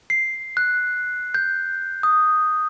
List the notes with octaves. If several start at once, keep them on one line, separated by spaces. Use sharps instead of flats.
C7
F#6
G6
D#6